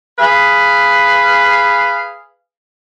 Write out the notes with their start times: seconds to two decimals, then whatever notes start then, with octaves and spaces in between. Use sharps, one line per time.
0.19 G#4 B4 F5